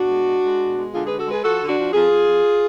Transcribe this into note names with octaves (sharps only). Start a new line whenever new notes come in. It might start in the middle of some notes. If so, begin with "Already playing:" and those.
Already playing: B2 D4 F#4
G#3
G#3
G#3
B2
G#3
D3 F4 G#4
D3 G#4 B4
F#4 A4
G#3 G#4 B4
F3 F#4 A4
D3
D4 F#4
F3
F2 F4 G#4
F2
F2